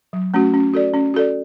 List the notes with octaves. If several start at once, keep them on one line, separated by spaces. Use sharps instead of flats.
F#3
A3 C#4 F#4
C#4
F#4 A4 D5
C#4
F#4 A4 D5